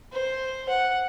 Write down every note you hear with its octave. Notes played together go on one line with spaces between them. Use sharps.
C5
F#5